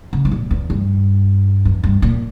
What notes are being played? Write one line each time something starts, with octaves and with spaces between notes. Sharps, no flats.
C#3
G#2
A#2
E2
G2
E2
G2
A#2